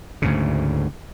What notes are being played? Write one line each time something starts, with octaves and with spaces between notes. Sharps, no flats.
D2 G#2 C#3